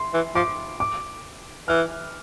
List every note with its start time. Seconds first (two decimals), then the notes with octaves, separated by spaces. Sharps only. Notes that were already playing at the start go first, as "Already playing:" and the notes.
Already playing: C6
0.14 E3
0.35 F3 D6
0.80 D6
1.68 E3 F6